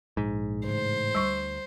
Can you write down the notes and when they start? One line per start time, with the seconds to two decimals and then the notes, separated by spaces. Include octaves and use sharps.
0.17 A#1 G#2
0.67 A2 C#3 E3 C5
1.15 D2 G3 C#6